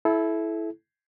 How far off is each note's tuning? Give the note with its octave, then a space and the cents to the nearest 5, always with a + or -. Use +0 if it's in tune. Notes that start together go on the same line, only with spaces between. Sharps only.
E4 +0 A4 -30